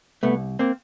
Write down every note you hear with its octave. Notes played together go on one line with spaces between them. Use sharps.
C2 A3 B3
A#3 C4